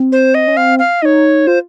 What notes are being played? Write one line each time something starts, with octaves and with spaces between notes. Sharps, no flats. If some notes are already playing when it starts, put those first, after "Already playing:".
Already playing: C4
C5
D#5
C#4
C4 F5
F5
D#4 C#5 D#5
F4 C5